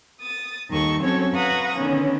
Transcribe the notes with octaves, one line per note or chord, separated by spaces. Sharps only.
D#6 A6
D#2 D#3 G3 A4 C#6
F#3 C4 C#4 F#4 A4 C#5
B4 F5 F#5 A#5 C#6 D#6
D3 D#3 B3 C#4